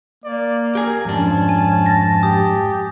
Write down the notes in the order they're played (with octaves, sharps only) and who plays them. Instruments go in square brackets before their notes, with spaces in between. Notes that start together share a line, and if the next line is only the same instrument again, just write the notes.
[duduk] A#3 [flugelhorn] D5
[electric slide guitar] G4 G#5 [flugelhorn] A#4
[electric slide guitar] F2 G#2 D4 [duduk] C#4 [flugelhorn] A5
[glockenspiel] G#5
A6 A#6
[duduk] G4 [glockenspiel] D#6